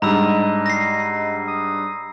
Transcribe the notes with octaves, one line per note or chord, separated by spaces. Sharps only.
G#2 G3 D4 D#5 A#5 B5 E6
A#6 C7
D#6